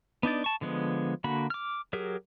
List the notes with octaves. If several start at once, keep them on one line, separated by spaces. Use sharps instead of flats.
B3 D4 D#4 D5
A5 C#6
D3 F3 G#3 B3
D3 A#3 F#4 B5
D6 F6
F#3 G4 G#4 A#4